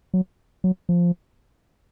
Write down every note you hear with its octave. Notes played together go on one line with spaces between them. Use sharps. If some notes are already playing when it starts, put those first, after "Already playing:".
F#3
F#3
F3